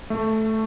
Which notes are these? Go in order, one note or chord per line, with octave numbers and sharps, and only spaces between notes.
A3